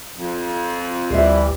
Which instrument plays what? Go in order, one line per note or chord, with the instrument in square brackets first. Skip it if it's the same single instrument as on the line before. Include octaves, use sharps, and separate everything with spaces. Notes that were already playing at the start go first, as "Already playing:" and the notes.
[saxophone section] F2
[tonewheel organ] D2 [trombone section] E3 G3 [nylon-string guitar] C5 E5